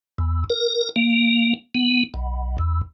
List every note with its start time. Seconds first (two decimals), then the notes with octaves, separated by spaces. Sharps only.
0.18 E2
0.50 A#4
0.96 A#3
1.75 B3
2.14 B1
2.58 E2